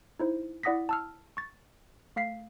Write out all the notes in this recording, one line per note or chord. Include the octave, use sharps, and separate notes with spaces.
D#4 E4 C5
E4 D5 F#5 D#6 A#6 B6
A5 E6 F6
C#6 A6
A3 F5 B6 C7